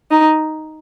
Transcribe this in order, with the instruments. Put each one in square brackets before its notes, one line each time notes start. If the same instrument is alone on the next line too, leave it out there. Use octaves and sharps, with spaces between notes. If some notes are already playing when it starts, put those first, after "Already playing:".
[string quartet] D#4